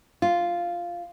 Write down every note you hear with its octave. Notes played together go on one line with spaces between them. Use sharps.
F4